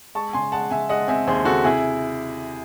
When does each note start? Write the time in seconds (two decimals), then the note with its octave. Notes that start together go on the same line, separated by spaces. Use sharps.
0.15 G#3 A5 C#6
0.33 C#3 G#5 C6
0.52 G#3 F#5 A5
0.70 C#3 E5 G#5
0.89 G#3 D#5 F#5
1.08 C4 E5 G#5
1.27 D#2 G#4 C5
1.45 C#3 F#4 A4
1.64 C3 E4 G#4